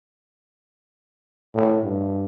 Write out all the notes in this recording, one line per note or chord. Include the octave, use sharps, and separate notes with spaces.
A2
G2